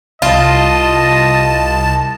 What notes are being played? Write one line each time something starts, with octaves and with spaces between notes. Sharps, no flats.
C2 F4 D#5 A5